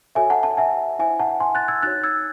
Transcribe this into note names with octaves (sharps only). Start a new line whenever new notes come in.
F#4 A4 C#5 E5 G#5
F#5 A5
F#5 A5
E5 G#5
E4 C5 E5 G#5
F#5 A5
G#5 C6
F#6 A6
E6 G#6
D#4 F#4 C#5 F#6 A6
E6 G#6